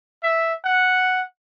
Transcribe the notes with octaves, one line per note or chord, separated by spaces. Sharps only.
E5
F#5